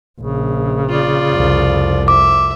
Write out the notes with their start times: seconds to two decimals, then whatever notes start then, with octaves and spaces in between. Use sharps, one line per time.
0.21 A#1 C#3
0.89 F4 D5
1.32 C2 F2
2.08 E5 D6